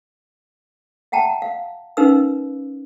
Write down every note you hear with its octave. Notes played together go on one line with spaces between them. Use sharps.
E5 F#5 G5 A5 A#5
F5
C#4 D#4 A#4 B4 F5 E6